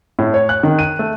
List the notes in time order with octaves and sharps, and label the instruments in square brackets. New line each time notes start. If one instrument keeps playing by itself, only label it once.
[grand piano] A2
C#5
F#6
D#3
D#7
A3